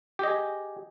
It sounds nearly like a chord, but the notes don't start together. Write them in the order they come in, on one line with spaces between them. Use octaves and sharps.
G4 D#5 G#4